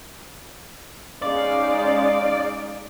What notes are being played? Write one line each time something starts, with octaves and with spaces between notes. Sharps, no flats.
G#3 C#4 D#4 D5 F5